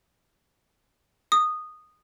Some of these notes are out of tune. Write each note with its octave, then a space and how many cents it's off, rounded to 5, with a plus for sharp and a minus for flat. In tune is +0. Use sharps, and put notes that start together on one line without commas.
D#6 -10